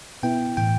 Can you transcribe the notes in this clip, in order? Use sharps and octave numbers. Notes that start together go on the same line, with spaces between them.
B2 B3 E4 G5
A2 E3 G5